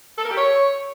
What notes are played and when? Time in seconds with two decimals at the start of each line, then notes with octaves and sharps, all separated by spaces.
0.18 A4
0.24 A#4
0.30 G4
0.36 C#5